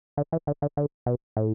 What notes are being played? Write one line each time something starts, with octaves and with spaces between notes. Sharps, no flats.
D3
E3
D3
D3
D3
B2
A2